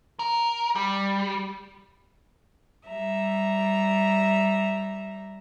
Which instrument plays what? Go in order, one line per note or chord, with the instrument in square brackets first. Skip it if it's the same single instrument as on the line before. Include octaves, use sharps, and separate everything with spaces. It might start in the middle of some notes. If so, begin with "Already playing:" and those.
[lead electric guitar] A#4
G3
[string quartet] G3 E5 A#5